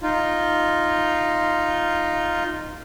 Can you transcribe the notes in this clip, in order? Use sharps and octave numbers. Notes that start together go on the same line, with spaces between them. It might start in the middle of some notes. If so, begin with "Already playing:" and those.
D#4 F4